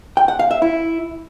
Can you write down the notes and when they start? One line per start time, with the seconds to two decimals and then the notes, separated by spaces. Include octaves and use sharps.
0.17 G5
0.28 F#5
0.39 F5
0.51 E5
0.62 E4